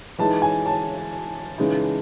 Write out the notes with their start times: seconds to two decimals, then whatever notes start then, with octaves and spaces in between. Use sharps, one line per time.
0.19 E3 G#3 D#4 A5
0.42 G#5
0.66 A5
1.58 C#3 E3 G#3 D#4